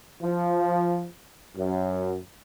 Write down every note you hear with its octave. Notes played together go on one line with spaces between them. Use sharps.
F3
F#2